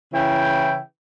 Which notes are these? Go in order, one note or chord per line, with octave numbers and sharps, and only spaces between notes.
C#3 E3 E4 G5